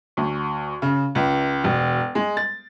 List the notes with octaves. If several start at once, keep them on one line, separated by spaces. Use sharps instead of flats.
D2
C#3
C#2
E1
G#3
A6